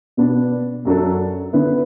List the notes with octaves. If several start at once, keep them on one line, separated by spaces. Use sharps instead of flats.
B2 B3 D4
F#2 F#3 D4 A4
D3 B3 E4 B4